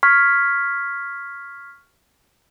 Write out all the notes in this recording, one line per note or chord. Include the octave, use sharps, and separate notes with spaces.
C#6 F6 G#6 B6